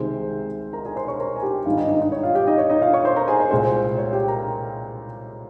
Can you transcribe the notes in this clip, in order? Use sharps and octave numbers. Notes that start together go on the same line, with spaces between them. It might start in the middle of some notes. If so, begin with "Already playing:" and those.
Already playing: C2 C3 D#3 G#3 C5
A#4 A#5
G#4 G#5
C5 C6
C#5 C#6
A#4 A#5
G#5
G4 G5
G#1 G2 D#3 G3 F4 F5
D#4 D#5
D#4 D#5
D#4 D#5
C#5
F4 F5
G4 G5
D#4 D#5
C#5
D#4 D#5
F4 F5
C#5 C#6
C5 C6
A#4 A#5
G#4 G#5
C5
C2 A#2 G#3 C5
C#5
G4 G5
A#4 A#5